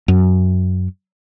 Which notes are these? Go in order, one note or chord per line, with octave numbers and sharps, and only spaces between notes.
F#2